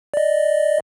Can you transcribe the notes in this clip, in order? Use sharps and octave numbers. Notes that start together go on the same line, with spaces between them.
D5 D#5